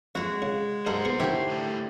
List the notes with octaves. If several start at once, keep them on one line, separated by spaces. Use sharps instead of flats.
F2 G#3 F#4 A#5
C#3
G2 A4 A#4 C5 D#5 F#5
B3 G#4
D3 D#3 E4 G4 C#5 G5
A2 G3